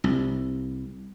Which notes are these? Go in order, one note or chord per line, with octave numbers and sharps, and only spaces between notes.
C2